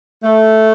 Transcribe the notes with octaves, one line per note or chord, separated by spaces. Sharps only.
A3